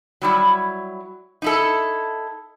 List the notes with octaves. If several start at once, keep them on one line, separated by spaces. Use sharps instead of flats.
F#3 G3 E4
D#4 E4 A4